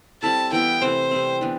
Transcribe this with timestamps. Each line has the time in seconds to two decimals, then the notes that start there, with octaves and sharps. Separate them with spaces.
0.22 G3 C4 E4 A4 A5
0.52 E3 B3 E4 G5
0.81 C3 E3 A3 C5
1.11 C3 G3 C4
1.41 E3 B3 D4 G4